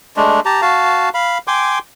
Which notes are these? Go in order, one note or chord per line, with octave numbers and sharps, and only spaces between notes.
G#3 A3 D4
G4 A5 A#5
F#4 F5 A5
F5 B5
G5 G#5 C6 D6